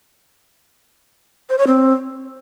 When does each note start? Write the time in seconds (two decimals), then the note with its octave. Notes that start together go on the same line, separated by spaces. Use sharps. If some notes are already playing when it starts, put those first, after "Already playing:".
1.50 C5
1.58 C#5
1.67 C4